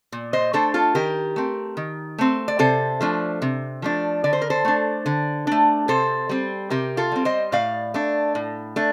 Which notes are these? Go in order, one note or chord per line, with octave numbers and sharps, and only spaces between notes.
A#2
C5 D#5
A3 D4 A4 C5
F4 A4
D#3 G4 A#4
A3 C4
D#3
A3 C4
D5
C3 A4 C5
F3 A3 D4
C3
F3 A3 D4
D3 D5
C5
A#4
A4 C5
A3 D4
D3
A3 D4
C3 A4 C5
G3 C4
C3 G4 A#4
F4 A4
G3 C4
C5 D#5
A2 D5 F5
A3 D4
A2
A3 D4